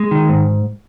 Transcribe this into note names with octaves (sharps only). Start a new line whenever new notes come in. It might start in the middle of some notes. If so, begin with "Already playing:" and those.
Already playing: G#3
D#3
G#2